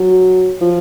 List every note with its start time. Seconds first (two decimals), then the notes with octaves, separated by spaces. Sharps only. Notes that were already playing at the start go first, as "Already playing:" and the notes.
Already playing: F#3
0.61 F3